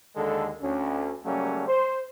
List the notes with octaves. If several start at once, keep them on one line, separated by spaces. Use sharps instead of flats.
D#2 D3 D#3 G#3 A4
D2 C#4
C#3 F#3 G3 A3 A#3 C#4
C5